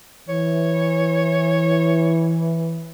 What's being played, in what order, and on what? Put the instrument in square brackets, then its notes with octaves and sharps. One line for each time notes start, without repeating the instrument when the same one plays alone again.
[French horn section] E3 [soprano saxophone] C#5